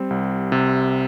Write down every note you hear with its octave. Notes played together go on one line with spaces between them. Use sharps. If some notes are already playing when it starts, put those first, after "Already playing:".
Already playing: G3 C4
C2
C3